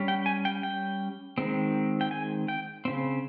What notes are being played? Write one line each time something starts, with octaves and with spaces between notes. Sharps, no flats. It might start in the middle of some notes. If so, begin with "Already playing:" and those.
Already playing: G3 C#4
G5
G#5
G5
G5
D#3 G#3 C4
G5
G#5
G5
C#3 F3 C4